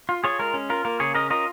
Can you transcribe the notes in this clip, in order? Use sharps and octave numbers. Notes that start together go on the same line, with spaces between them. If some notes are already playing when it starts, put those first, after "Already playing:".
F4
F4 G#4 C#5
G#3 A#4
C#4
F4 A#4
A#3 A#4
C#3 G#4 C#5
C#4 A#4 D#5
F4 A#4 D#5